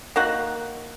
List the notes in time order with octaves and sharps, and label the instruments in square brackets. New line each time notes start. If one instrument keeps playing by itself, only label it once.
[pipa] D#3 A#3 F#4